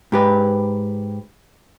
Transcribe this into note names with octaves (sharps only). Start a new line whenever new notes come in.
G#2 G4 B4